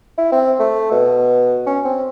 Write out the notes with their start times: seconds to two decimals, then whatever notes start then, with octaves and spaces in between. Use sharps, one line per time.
0.18 E4
0.32 C4
0.60 A3
0.92 B2
1.67 C#4
1.85 C4